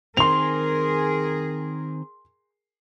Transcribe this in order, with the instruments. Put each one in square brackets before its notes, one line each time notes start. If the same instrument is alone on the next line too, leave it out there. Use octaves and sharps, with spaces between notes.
[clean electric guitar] D#3 C4 [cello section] G#4 A#4 [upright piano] C6 F7